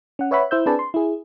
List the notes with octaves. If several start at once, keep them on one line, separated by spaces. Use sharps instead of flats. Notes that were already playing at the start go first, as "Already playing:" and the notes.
C#4 F#5
B4 C#5 E5 F#5 B5
E4 C5 E6 G6
C4 D4 G#4 B4 D5 A5
C6
E4 G#4